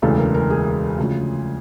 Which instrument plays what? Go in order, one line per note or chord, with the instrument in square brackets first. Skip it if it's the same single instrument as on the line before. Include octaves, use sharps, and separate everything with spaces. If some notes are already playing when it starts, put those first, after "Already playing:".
[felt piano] E1 D2 C#3 E3 A4
A#4
A#4
G#4
D2 C#3 F3